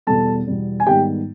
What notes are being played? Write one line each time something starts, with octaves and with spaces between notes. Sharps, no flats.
E2 B2 G3 A4 A5
E2 B2 G3
G#5
G#2 D#3 G3 B3 G4 G5